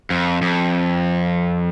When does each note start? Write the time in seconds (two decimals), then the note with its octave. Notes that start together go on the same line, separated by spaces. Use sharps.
0.10 F2
0.42 F2